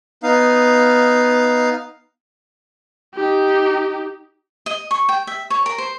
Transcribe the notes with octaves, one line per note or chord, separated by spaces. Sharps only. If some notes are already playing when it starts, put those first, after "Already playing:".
B3 D#4 F5
D#4 G4
D#5
C#6
G5
E5
C#5
A#4
C5